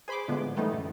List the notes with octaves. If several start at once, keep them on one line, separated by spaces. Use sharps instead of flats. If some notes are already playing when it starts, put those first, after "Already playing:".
G#4 C5 B5 C6 D6
A2 D3 F3 G#3 B3
D#3 E3 G3 A3 B3 D#4
F#2 A2